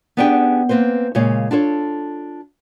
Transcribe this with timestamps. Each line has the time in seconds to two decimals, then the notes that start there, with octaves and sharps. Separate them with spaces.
0.17 B3 C#4 D4 G4 G#4 G5
0.69 A#3 C4 B4 C5
1.15 A#2 C#3 G#3 C#5 F5
1.51 D4 F4 A4 C#5